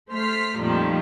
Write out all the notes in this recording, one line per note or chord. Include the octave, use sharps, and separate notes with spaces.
A3 C5 F6 B6 C7
F2 A#2 D#3 F3 G3 A3